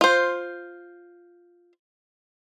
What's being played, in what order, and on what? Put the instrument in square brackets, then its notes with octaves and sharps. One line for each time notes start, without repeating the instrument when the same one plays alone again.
[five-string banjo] F4 C5